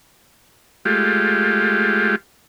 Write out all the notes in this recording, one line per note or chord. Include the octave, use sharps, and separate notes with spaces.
G#3 A3 F4 G4